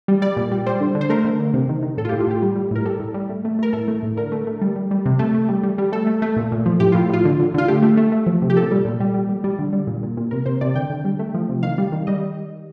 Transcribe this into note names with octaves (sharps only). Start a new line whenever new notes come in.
G3
G3 D5
A#2
G3
G3 C5
D3
D3
C5
A3 A#4
D3
D3
C3
D#3
D#3
A2 A4
F4
A2 G4
F4
A2 G4
G3
G3
A2 A#4
G3 A4
A2
G3
A3
A3
A3 A#4
A2 A4
A3
A2
D3 A#4
A3
A3
G3
G3
G3
C3
A3
A3
G3
G3
G3
A3 A4
A3
A3
A#2
A#2
F3
A2 G4
A2 F4
A2 F4
D3
D3
D3 F4
A3 G4
A3
A3
A3
F3
C3
G4
A#2 A4
G3
A#2
G3
G3
G3
G3
D3
G3
A#2
A#2
A#2
C3 A#4
C3 C5
C3 D5
D3 G5
D3
G3
A3
F3
C3
D#3 F5
G3
D#3
G3 D#5